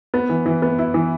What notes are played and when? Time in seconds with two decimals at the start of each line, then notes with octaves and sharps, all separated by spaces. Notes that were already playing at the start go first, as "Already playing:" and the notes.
0.14 B3
0.29 E3
0.46 E3
0.62 B3
0.79 E4
0.94 E3